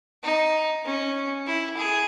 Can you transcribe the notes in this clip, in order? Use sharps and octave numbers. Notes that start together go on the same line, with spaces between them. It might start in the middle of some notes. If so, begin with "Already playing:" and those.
D#4
C#4
E4
G#4